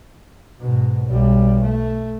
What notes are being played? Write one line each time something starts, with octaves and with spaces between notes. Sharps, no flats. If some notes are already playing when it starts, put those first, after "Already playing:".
G#2 B2
B1 G3
A3